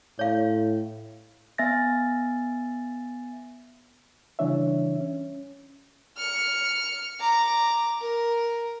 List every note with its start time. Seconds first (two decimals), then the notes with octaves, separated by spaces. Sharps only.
0.19 A2 C#5 F5
1.58 B3 E5 G#5 A6 A#6
4.39 C#3 E3 G3 D4 C#5 E5
5.01 C#4
6.17 F6 C#7
7.20 A#5 D6
8.01 A#4